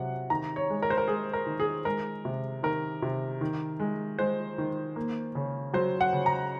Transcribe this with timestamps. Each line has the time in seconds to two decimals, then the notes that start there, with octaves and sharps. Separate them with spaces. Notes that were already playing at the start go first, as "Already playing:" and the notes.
Already playing: C3 F#3 F#5
0.30 D#3 A#5
0.56 C#5
0.70 G#3
0.82 A#4
0.90 C5
0.98 A#4
1.08 G#3 G#4
1.33 A#4
1.46 D#3
1.60 G#4
1.85 G#3 A#4
2.25 C3
2.63 D#3 A#4
3.02 C3
3.41 D#3
3.80 G#3
4.19 G#3 C5
4.58 D#3
4.96 A#3
5.35 C#3
5.73 F#3 C5
6.01 F#5
6.13 C#3
6.26 A#5